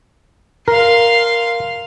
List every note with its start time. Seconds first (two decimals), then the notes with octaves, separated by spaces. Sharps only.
0.68 A#4 F5 C6